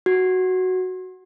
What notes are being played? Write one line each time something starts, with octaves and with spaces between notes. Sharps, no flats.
F#4